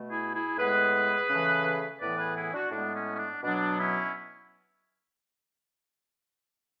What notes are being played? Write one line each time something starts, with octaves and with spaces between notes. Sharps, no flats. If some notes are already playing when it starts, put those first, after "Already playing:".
Already playing: B2 A3
E4 G#4
E4 G#4
A2 G#3 B3 G#4 B4
C#3 E3 A3
A2 E3 B3 B4 D5
G#4 B4
E4 G#4
D4 F#4
A2 G#3 B3 D4
C#4
C#4
D4
B2 F#3 B3 D4
C#4 E4